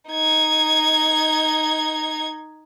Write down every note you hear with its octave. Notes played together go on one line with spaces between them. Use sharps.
D#4 G#6